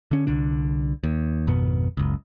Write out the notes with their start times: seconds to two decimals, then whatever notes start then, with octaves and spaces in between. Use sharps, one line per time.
0.11 D3 C#4
0.27 C2 D3 D4
1.04 D#2
1.47 G#1 F2 B2 B3
1.97 F#1 C#2